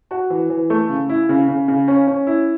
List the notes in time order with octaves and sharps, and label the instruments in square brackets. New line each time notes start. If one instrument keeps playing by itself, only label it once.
[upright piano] F#4
E3
E3
A3
C#3
E4
C#3
C#3
C#3
C#4
C#4
E4